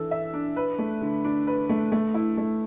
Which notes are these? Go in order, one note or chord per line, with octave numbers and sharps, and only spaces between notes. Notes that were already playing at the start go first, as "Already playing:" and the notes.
Already playing: E3 D4 A4 E5
E5
D4
B4
A3
D3
D4
B4
A3
A3
E4
A3